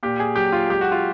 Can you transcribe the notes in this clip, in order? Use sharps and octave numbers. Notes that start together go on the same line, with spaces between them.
A#2 G4
G#4
F#3 G4
F4
G#3 G4
F#4
F4